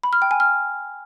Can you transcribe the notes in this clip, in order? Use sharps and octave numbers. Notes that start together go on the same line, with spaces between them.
B5
F6
G5
G#5
F6